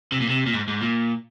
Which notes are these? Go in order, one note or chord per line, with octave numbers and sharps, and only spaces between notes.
C3
A#2
C3
A#2
G#2
G#2
A#2